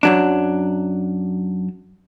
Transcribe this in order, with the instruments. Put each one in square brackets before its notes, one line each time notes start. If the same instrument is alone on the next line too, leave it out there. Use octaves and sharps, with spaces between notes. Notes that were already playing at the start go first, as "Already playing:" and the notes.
[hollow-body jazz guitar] F#2 F#3 D4